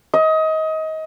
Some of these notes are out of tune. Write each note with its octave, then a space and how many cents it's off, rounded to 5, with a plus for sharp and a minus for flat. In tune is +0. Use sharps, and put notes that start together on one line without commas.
D#5 +25